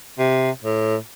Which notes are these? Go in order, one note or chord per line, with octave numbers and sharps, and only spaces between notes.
C3
A2